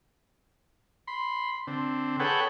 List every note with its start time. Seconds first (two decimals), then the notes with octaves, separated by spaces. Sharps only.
1.07 B5 C6
1.67 D3 C4
2.20 G#4 A4 B4 C#5 F#5 G5